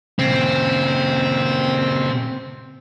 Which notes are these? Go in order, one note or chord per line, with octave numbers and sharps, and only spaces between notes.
A#2 C#3 C4